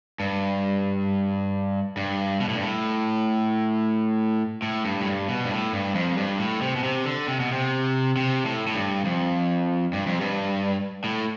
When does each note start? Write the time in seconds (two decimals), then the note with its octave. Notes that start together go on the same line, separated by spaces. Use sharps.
0.20 G2
1.97 G2
2.41 B2
2.48 A2
2.55 G2
2.62 A2
4.62 A2
4.85 G2
5.01 A2
5.06 G2
5.28 B2
5.44 G2
5.50 A2
5.73 G2
5.95 F2
6.17 G2
6.39 A2
6.61 C3
6.76 B2
6.83 C3
7.05 D3
7.28 C3
7.40 B2
7.52 C3
8.17 C3
8.46 A2
8.67 A2
8.75 G2
9.05 F2
9.93 G2
10.07 F2
10.21 G2
11.04 A2